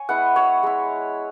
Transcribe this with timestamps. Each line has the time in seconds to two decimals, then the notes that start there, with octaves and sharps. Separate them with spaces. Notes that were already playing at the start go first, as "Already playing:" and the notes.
Already playing: C#5 G#5
0.09 G#3 B3 E4 F#5
0.36 C#5
0.63 G#3 E4